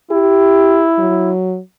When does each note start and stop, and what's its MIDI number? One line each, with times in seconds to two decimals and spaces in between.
0.11 1.32 64
0.11 0.85 67
0.99 1.59 54